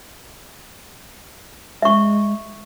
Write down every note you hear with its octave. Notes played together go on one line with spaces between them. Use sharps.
G#3 E5 C#6